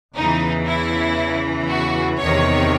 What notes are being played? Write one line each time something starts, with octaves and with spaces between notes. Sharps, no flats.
E2 C#3 E3 D#4
E4
F#4
E2 C3 D#3 C#5